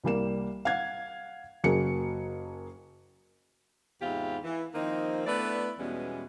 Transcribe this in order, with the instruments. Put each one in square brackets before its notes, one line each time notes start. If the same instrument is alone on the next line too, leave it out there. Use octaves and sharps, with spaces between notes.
[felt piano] C2 G3 A#3 E7
F5 F#5 G#6
F#1 F#3 A#3 G#4 C#7
[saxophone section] E2 G#2 C3 E4 F4 G4
E3
D#3 F3 A#3 C4 D#4
A3 B3 D4 E4 B4 D5
E2 B2 E3 G3 G#3 C#4